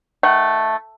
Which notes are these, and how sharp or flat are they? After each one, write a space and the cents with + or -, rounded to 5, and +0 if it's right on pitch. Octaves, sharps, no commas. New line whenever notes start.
D#3 +15 A3 +0 F#5 +30